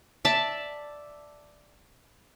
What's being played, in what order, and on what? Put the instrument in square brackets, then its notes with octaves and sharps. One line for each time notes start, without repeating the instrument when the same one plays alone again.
[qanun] D5 E5 A5